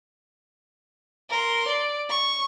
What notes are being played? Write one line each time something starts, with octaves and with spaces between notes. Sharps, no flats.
A#4 C6
D5
C#6